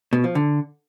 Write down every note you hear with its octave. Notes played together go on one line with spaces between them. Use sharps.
B2
F3
D3